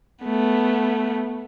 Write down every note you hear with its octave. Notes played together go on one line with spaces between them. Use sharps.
A3 B3